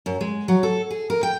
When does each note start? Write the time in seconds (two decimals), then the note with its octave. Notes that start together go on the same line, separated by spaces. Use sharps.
0.06 F#2
0.21 G#3
0.48 F#3
0.63 A4
0.91 G#4
1.10 A#4
1.23 G5